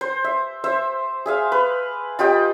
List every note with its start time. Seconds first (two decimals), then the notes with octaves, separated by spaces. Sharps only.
0.01 C5
0.24 E5
0.64 C5 E5
1.26 G#4 E5 F5
1.52 B4
2.19 F4 G4 D#5 G5